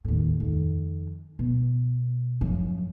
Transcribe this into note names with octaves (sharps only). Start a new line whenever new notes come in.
D#2 A2
F2 D#3
B2
F#2 F3